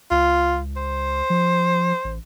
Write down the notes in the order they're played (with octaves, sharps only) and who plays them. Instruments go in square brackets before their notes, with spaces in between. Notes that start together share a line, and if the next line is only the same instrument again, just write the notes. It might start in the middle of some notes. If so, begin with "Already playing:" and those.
[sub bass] C#2 [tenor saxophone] F4
[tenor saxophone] C5
[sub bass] F3
A1